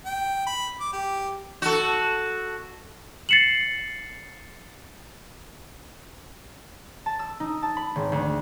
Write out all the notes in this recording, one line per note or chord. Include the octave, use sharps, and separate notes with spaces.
G5
B5
D6
G4
F#4 A4
A6 C7 C#7 E7 F#7
A5
E6
D#4
A5
B5
G#1
D2